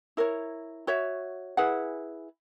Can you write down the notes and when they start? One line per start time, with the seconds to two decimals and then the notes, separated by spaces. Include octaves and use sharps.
0.17 E4 A#4 C#5
0.87 F#4 C#5 E5
1.57 E4 G#4 B4 F#5